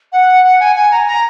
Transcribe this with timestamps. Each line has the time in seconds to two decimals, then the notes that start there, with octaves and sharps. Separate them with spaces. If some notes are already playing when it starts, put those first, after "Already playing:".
0.13 F#5
0.44 F#5
0.60 G#5
0.76 G#5
0.91 A#5
1.07 A#5